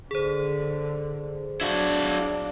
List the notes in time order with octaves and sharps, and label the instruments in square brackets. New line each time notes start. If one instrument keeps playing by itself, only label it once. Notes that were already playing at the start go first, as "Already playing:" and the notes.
[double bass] D3 [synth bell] G#4 C5
[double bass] F#3 D4 [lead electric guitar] E4 F#4